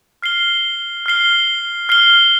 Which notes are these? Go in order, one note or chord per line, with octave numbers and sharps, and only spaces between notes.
F6 C7 G7
F6 C7 G7
F6 C7 G7